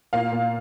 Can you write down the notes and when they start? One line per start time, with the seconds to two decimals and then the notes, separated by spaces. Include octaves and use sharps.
0.13 A#2 F5
0.32 A#2